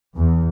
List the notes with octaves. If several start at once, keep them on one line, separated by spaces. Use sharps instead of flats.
E2